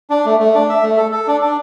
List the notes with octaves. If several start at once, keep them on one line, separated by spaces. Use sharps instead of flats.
D4
A3
A3
D4
E5
A3
A4
A4
D4
D4